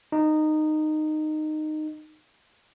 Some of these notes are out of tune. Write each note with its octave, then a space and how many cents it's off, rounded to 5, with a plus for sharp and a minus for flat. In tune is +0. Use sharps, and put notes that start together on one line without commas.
D#4 -15